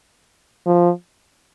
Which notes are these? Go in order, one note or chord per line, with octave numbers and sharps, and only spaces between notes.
F3